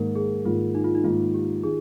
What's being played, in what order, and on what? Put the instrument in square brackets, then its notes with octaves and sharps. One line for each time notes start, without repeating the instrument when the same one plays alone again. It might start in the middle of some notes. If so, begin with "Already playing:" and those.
Already playing: [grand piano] G#2 D#3 A#3 [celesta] A#4
[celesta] G#4
[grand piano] G#2 D#3 A#3 [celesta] F4
[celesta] D#4
F4
D#4
[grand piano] G#2 D#3 A#3 [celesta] F4
[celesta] G4
[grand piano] D#3 [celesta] G#4